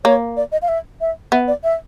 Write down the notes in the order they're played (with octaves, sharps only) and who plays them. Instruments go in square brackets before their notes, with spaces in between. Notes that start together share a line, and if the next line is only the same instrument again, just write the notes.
[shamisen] A#3 [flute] C#5
[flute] D5
D#5
F5
E5
E5
[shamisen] B3 [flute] E5
[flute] D5
E5